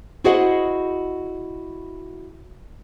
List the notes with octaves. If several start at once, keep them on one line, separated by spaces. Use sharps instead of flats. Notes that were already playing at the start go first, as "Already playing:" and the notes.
E4 F#4 G#4 C5 D#5 F#5